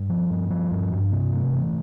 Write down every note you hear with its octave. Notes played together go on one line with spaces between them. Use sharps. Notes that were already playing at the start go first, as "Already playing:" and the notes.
Already playing: G2
F3
G2
F3
G2
G2
C3
A3
E3